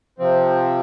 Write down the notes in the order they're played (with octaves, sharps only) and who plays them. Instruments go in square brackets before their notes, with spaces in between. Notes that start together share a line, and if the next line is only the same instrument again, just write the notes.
[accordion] C3 F3 C4